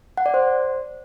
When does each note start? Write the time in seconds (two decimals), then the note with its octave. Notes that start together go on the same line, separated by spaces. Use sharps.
0.17 F#5
0.26 D5
0.34 C5